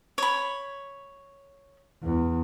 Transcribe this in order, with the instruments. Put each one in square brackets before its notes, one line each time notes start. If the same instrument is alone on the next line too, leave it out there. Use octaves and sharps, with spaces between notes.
[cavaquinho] C#5 B5
[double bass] E2